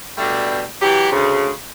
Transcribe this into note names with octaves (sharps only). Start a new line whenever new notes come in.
B2 G3 A3 D4
E3 F#3 G4
D2 C#3